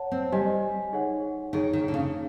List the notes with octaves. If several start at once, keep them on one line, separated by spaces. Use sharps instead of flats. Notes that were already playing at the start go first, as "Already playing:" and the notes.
Already playing: C#5 F#5 A5
C4
G3 G4 C5 D#5 G#5
D#4 G#4 C#5 F#5
D#3 D#4 G#4 C#5
D#3
D3
C#3